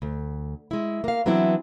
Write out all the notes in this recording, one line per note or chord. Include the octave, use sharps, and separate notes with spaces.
D2
G#3 E4
A#3 F5
E3 F#3 B3 C4 D4 E4